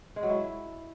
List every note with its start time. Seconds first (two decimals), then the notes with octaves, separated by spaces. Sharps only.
0.16 G#3
0.23 F#3
0.29 E4